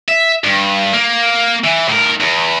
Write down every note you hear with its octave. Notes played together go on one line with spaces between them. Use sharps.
E5
G2
A#3
E3
A2 A#4
E2